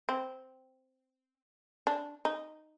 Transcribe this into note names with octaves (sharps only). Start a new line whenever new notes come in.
C4
D4
D#4